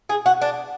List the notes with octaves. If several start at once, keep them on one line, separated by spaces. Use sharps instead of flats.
G#4
F#4
D4